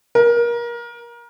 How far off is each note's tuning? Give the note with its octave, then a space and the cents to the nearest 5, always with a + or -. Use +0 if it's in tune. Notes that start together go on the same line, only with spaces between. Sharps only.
A#4 +25